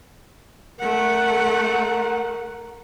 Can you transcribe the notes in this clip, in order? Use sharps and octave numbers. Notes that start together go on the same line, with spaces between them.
A3 A#4 F#5